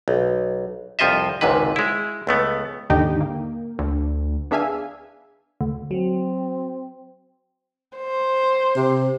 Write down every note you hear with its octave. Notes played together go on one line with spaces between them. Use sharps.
B1
C2 F2 F3 F4 D#5 E5
G#1 C#2 G#2 C3 B4
G#3 E4
C#2 A3 B3
D#2 G#2 D3 D#4 G4 G5
A#3
D2
B3 D4 G#4 E5 F5 G#5
D2
F#3 C4
C5
C3